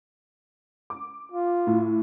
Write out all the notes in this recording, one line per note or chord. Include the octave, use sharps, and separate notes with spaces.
D6
F4
A2